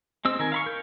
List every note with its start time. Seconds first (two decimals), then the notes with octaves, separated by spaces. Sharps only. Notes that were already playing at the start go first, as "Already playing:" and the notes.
0.25 G#3 C4 E6
0.39 D#3 A#4 G#5
0.52 F5 B5 C#6
0.66 A#4 G6